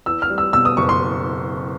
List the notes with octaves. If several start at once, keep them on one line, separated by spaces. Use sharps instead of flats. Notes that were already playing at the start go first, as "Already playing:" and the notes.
E2 E6
F6
G3
E6
B2 E6
D#6
F#1 C#6
C6